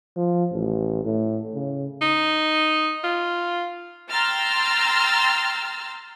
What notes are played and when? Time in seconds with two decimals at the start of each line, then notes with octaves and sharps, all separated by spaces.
0.16 F3
0.51 A1
1.05 A2
1.55 C#3
2.01 D#4
3.04 F4
4.10 G5 A#5 C6 E6 F6 A6